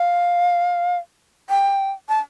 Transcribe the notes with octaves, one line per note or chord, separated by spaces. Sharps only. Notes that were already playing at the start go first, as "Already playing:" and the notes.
Already playing: F5
G5
A5